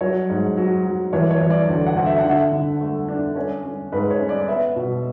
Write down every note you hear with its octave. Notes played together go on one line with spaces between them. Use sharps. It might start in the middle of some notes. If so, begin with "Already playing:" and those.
F#3 C#5
G#2
F#3
F#3
E3 C#5
C#5
E3
D5
D2
F#5
D2
E5
F#5
D3
E5
D3
A3
D4
C#4 C#5
C#4
G#2 B4
C#5
C#4
D5
B3 E5
B2